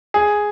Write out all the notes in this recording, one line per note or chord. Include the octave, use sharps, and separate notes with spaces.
G#4